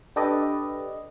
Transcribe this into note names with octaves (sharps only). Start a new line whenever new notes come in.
D4 G4 A4 B4 D5 D#5